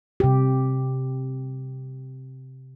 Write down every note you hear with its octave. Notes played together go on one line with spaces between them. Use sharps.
C3 G4